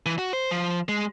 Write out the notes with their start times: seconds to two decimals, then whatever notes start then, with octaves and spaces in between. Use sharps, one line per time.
0.06 E3
0.19 F#4
0.33 C5
0.51 F3
0.89 G#3